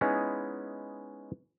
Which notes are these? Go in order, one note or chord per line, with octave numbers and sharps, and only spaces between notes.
G#3 B3 C#4 D#4 E4 G#4